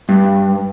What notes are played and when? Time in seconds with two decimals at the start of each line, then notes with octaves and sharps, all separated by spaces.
0.09 G2